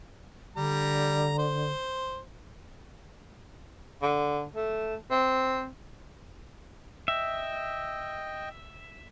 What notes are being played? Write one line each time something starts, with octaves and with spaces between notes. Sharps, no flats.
D3 G3 A#5
C5
D3
A3
C4
D#5 E5 G5